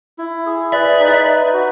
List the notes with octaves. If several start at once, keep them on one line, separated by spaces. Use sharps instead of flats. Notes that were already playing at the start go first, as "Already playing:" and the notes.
E4
G#4
B4 D5 E5
D#4
B4
F#4